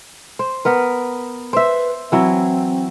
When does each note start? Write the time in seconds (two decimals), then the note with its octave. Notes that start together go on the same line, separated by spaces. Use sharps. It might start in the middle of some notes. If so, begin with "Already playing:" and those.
0.39 C5
0.65 B3 A#4 B4
1.53 B4 C5 E5
2.12 E3 F#3 C4 E4